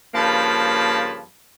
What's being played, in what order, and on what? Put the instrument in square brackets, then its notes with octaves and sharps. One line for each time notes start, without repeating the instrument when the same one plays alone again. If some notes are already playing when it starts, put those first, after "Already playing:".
[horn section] G2 C#3 F3 A#3 A5 B5